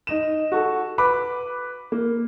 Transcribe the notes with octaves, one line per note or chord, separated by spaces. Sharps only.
D#4 D#5 E7
F#4 A4
B4 B5 D6
A#3